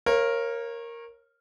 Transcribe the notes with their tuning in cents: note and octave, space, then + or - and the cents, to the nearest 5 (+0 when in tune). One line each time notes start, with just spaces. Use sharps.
A#4 +0 C#5 -30 F5 -30